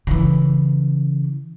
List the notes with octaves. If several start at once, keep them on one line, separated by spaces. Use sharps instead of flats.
C#3 E3